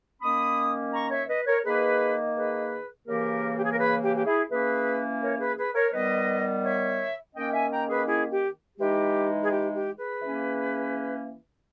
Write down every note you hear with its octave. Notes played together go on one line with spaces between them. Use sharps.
D#3 A#3 C#4 B5 D#6
A#5 C#6
C#5 E5
B4 D#5
A#4 C#5
D#3 A#3 D#4 G#4 B4
G#4 B4
C#3 E3 A#3 G4 A#4
G4
G#4
A#4
G#4 B4
G4
G4
E4 G#4
E3 A#3 C#4 G#4 B4
A#4 C#5
G#4 B4
G#4 B4
A#4 C#5
D#3 G3 B3 B4 D#5
C#5 E5
D#3 A#3 C#4 D#5 G5
E5 G#5
G5 A#5
G#4 B4
E4 G#4
G4
E3 G#3 D#4 G4
G#4
G4
G4
G#4 B4
E3 A#3 C#4